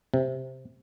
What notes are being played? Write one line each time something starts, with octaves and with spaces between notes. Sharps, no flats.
C3